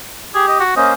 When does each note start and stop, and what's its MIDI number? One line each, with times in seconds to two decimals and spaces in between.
0.35 0.63 67
0.35 0.47 68
0.48 0.56 75
0.60 0.75 66
0.77 0.94 58
0.77 0.94 61
0.77 0.94 72
0.77 0.91 75